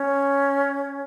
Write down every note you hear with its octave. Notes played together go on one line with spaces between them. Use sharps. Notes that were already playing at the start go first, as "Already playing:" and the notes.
Already playing: C#4